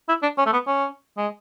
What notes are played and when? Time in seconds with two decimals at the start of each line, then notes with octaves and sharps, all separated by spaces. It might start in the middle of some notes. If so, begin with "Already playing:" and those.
0.09 E4
0.22 D4
0.38 C#4
0.46 A3
0.53 B3
0.67 C#4
1.17 G#3